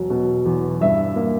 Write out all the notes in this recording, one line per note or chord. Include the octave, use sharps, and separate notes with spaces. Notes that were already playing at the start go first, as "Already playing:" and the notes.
Already playing: E1 F#3
B2
E2
G2 E5
A#3